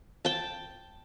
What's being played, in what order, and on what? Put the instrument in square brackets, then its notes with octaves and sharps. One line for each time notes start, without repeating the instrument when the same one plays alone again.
[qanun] G5 A5